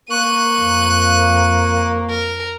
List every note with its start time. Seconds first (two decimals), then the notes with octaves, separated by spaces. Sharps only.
0.11 A#3 C#6 F#6 D#7
0.59 F2
2.10 A#4